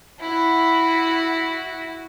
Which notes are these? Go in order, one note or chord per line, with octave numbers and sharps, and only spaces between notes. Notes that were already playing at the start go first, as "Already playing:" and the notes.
E4 F#4